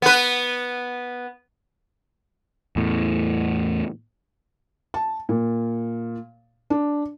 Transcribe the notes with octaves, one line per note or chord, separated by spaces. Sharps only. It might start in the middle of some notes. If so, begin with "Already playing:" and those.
B3 B4
E2 A2
A5
A#2
D4